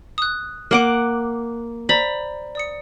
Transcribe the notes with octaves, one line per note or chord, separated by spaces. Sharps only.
D#6 F#6
A#3 F#5 D6
C5 D5 A#5 B5
D5 D#6 C#7